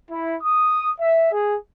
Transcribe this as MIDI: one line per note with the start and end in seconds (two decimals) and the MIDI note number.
0.11 0.34 64
0.42 0.91 87
1.00 1.30 76
1.32 1.56 68